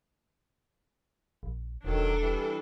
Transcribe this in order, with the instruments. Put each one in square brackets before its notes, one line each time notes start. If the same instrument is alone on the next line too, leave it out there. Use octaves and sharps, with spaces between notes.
[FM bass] A#1
[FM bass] E1 [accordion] D#3 F#3 [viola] D4 A4
[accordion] E3 G3